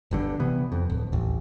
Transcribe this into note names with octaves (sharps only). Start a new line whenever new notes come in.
G1 G2 D3
C3 E3 B3
F2
D1
D#1 A1